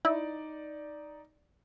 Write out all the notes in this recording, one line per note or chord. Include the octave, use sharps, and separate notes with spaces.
D#4 E4 D5